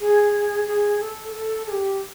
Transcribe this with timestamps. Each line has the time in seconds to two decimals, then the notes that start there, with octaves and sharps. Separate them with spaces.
0.01 G#4
0.67 G#4
1.00 A4
1.33 A4
1.67 G#4
1.71 G4